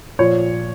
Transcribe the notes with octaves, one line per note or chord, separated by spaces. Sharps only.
A#2 F3 C#5